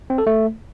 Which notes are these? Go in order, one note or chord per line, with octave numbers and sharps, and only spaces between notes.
C4
A4
A3